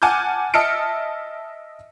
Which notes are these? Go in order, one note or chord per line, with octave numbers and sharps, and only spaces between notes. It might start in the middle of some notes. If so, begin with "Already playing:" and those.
F#5 G#5 A5 D6 F6 G6
D#5 E5 A5 F6 C#7 D7